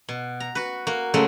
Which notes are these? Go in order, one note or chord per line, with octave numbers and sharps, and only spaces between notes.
B2
A#5
F#4 B4
A#3 F#4
C#3 F#3 G#3 A3